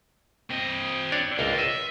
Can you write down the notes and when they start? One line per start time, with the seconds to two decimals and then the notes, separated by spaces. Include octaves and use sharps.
0.51 C4 D#5
1.12 D4 C#5 D5
1.39 C#2 D4 F4 A#4
1.58 D#5 E5